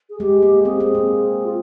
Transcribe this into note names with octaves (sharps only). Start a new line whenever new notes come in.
G#4
G#3 G4
A#3
C4 G#4
C4
A#3
F4